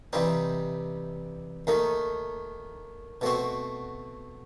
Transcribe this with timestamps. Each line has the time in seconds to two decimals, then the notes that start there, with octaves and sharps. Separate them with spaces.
0.13 C3 E3 G3 C4 D#4
1.67 D#2 D#3 A3 D#4
3.21 B2 A3 C4 F#4